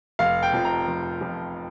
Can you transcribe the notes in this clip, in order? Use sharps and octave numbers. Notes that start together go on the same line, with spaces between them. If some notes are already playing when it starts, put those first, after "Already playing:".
F1 F5
G5
F2 F3
A#5
F1
F2 F3